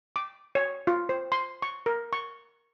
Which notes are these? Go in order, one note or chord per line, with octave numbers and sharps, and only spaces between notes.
D6
C#5
F4
C5
C6
C#6
A#4
C#6